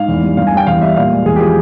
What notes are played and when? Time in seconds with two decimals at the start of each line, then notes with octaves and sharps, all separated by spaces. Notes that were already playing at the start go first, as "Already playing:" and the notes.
Already playing: G#2 F5
0.08 E2
0.23 G3
0.37 G2 F5
0.47 G#5
0.52 G3 G5
0.67 E2 F5
0.81 G3 E5
0.96 A#2 F5
1.12 G#3
1.26 E2 G#4
1.36 G4
1.40 F3 G#4